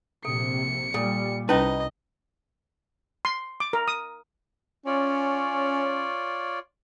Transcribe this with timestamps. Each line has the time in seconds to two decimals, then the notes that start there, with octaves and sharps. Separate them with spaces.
0.25 A#1 C3 A4 C#7
0.94 A#2 G3 A4
1.49 C2 C#4 D#4 E4 B4 D#5
3.25 C6
3.60 D6
3.73 A#4
3.88 D#6
4.86 C#4 F4 C#5 D5